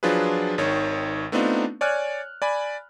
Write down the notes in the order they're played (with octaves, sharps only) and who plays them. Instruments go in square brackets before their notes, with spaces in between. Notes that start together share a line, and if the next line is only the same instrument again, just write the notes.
[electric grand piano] F3 F#3 D4 F4 G#4 B4
G#1 D#3 C#5
A3 B3 C4 D4 D#4 F4
C#5 D5 G#5 F6 F#6
D5 G#5 B5